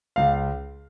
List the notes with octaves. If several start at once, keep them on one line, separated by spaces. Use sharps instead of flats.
C#2 F5